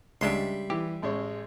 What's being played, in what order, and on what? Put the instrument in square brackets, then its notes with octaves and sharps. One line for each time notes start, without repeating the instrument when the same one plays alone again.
[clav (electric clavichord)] C#2 G#3 D4 [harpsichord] G3 E5 C6
[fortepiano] E3 [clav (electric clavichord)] G4
[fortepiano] A1 G#3 C#5